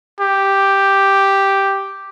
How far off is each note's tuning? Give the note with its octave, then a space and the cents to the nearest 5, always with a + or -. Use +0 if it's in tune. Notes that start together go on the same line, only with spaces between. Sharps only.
G4 +0